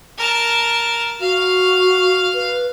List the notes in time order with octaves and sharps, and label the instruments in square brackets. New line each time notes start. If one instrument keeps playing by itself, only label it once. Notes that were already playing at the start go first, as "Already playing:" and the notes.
[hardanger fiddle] A#4 A5
[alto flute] F#4 [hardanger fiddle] F5
[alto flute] B4